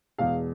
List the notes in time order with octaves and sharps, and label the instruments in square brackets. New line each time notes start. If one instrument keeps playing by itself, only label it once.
[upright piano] E2 B2 G#3 F5